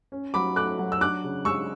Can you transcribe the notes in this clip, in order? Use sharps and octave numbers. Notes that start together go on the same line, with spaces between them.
C#4
F#3 B5 D6
A3 D6 F#6
F#3
E6
D4 D6 F#6
C#3
G#3 C#6 E6